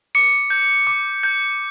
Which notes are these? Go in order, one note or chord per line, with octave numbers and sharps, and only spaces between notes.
D6 C#7
G6
D6
G6